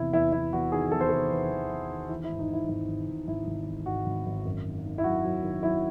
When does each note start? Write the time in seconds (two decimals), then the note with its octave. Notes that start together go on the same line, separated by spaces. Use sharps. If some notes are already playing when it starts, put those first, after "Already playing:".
Already playing: E2 C3 E4
0.13 E2 E4
0.33 E2 E4
0.53 E2 F#4
0.72 D#3 G#4
0.92 E2 A4
1.01 C5
1.09 C3 A4
1.31 E2
1.50 E2
1.70 E2
1.91 D#3
2.09 E3 E4
2.24 E4
2.29 G#2
2.39 D#4
2.49 G#2 E4
2.69 G#1 E4
2.88 G#1
3.08 G#1
3.27 G#1 E4
3.47 G#1
3.67 E3
3.86 G#2 F#4
4.06 G#1
4.26 G#1
4.45 F#2
4.65 D#3
4.84 D#3
4.98 E4
5.04 F#3 F#4
5.25 F#3
5.43 D#3
5.63 F#3 E4